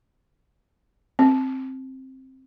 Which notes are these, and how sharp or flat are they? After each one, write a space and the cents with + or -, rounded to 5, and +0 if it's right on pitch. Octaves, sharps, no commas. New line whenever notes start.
C4 +10